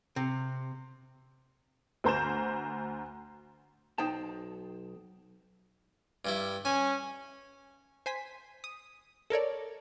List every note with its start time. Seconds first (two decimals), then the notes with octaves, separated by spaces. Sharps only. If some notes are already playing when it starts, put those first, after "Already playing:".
0.16 C3
2.04 D2 C5 A#5 G6 E7
3.98 B1 D#4 C5 G5 A5
6.25 G2 G3 E4
6.65 C#4 G#5
8.06 C5 G#5 B6
8.64 D#6
9.30 A4 A#4 C#5 D5